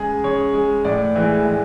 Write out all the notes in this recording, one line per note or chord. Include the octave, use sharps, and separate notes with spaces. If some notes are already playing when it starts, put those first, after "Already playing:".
Already playing: C#3 G#3 G#4
C#3 C#5
G#3
A2 D5
E3 G#3
A2